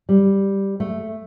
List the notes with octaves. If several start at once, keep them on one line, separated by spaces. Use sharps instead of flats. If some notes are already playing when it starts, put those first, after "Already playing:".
G3
A3